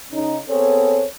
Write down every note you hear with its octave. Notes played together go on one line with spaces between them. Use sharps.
C#3 D#4
B3 C4 G#4 A4 C#5